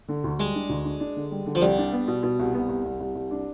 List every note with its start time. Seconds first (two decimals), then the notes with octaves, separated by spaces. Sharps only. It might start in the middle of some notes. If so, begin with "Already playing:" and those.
0.08 D3
0.24 D2
0.39 G3 G#3
0.55 D4
0.69 D2
0.84 D4
1.00 D4
1.16 D3
1.31 G3
1.46 D3
1.55 F3
1.61 C2 G3
1.78 D4
1.93 B3
2.07 B2
2.23 B2
2.39 C2
2.54 B3
2.69 C2
2.85 C2
3.00 C2
3.15 C2
3.31 D4